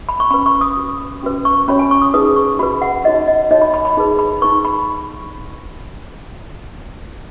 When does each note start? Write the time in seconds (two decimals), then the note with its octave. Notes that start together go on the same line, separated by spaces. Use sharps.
0.09 B5
0.20 C#6
0.30 C#4 B5
0.34 B4
0.46 C#6
0.61 D#6
0.77 F#4 B4
1.23 C#4 F#4 B4
1.45 C#6
1.68 C#4 F#4 C#5 B5
1.79 G#5
1.91 C#6
2.02 D#6
2.14 D#4 G#4 B4 D#6
2.36 C#6
2.59 F#4 B4 B5
2.82 F#5
3.05 D#4 F#4 C#5 D#5
3.28 D#5
3.51 D#4 F#4 C#5 D#5
3.62 B5
3.74 B5
3.85 B5
3.97 D#4 G#4 B4
4.19 B5
4.42 D#4 B4 C#6
4.65 B5